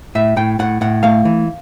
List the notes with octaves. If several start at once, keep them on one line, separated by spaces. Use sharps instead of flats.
A2 E5
A2 G5
A2 F#5
A2 F#5
A3 F5
E3